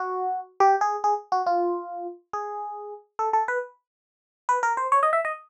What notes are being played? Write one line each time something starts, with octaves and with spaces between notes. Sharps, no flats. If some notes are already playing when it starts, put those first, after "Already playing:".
Already playing: F#4
G4
G#4
G#4
F#4
F4
G#4
A4
A4
B4
B4
A#4
C5
C#5
D#5
E5
D#5